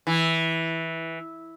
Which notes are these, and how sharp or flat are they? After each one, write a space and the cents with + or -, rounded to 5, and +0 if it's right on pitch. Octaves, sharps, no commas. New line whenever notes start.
E3 -10